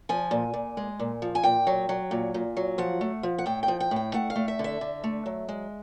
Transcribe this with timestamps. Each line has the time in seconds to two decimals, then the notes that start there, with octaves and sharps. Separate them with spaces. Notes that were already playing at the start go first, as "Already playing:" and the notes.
0.09 F3 G#5
0.31 A#2
0.53 A#2
0.77 G#3
0.99 A#2
1.22 F3
1.35 G#5
1.43 A#2 G5
1.67 F#3
1.89 F#3
2.11 A#2
2.34 A#2
2.57 F#3
2.78 F3 F#5
3.01 A3
3.23 F3
3.38 F#5
3.46 A2 G5
3.63 G5
3.68 F3
3.80 G5
3.91 A2
3.96 G5
4.14 A3 F#5
4.30 F5
4.36 A3
4.48 E5
4.59 D3
4.64 E5
4.81 D3
5.04 A3
5.26 F#3
5.49 G#3